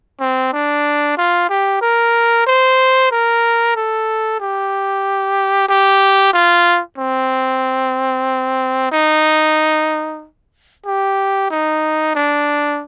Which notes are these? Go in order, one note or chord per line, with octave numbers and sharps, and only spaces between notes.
C4
D4
F4
G4
A#4
C5
A#4
A4
G4
G4
F4
C4
D#4
G4
D#4
D4